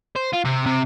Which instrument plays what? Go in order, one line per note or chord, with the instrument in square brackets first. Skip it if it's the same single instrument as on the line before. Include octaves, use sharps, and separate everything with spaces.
[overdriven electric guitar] C5
F4
C3
C3